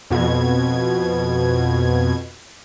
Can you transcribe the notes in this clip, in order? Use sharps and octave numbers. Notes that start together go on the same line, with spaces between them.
F2 B2 G#6